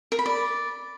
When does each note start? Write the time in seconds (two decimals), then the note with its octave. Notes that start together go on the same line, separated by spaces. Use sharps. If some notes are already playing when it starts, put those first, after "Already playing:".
0.12 A#4
0.19 B5
0.26 D5